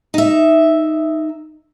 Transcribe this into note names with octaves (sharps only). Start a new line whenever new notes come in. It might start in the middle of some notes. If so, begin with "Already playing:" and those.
D#4 E5